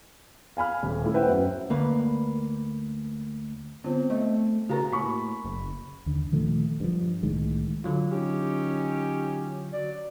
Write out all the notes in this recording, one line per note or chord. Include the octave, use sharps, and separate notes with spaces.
F5 G#5 B5 F6
D#1
A3 E4
B4 C5 E5 F#5 G5
F#2
D2 A#3 B4
D3 B3 C4 F4
A3 D#5
C#3 F#4 G4 A#4 B4 A#5
A2 A#3 B5 C#6
F#1
D#2 D3
A#2 D#3 F3 A3
G2 F3
C2 A2 D#3 G#3
D3 F#3 F4
C#4 D#4 G4
F#3 D5